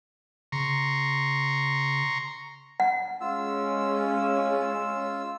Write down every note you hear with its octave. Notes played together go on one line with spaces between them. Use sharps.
C#3 A#5 C6 C#6
F#5
G#3 C#4 F4 E6